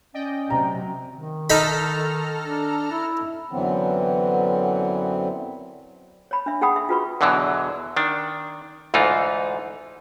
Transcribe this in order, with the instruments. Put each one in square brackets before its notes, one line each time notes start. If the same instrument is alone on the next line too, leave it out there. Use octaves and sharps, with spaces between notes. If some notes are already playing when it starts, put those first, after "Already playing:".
[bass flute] C#4 [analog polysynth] D5 D#5 G5
[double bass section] C3 F#3 [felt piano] A#5
[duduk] D#3
[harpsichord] D#4 B5 [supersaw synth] A4 A#5 F6
[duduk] D4
E4
[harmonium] F#2 D3 E3 F#3 B3 C4
[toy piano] C#5 B5
D4 E5
D#4 G#4 F#5 G5 B5 D#6
E5
F4 F#4 G#4 B4 B5 C#6
[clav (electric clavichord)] E2 B2 D3 E3 F#3
D#3 D4
D2 G#2 E3 D#4 F4